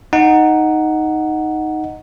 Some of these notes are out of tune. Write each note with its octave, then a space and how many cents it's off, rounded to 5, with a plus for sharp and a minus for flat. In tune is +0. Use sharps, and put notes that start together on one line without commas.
D#4 +0 F#5 +0